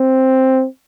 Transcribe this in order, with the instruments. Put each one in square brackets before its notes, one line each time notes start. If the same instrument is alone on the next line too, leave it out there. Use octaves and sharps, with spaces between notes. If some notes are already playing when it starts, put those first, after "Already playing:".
Already playing: [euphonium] C4